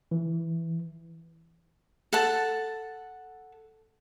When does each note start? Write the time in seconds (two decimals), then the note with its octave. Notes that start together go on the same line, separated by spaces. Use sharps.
0.11 E3
2.13 A4 F#5 A5